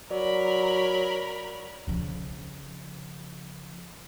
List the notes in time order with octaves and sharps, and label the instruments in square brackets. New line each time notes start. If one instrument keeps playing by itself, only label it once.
[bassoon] F#3 [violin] A#4 B5 [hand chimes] D5
[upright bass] C#3 F3